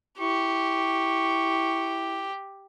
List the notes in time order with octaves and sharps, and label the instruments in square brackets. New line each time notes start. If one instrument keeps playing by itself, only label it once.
[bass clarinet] E4 [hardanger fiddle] G4 [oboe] C#6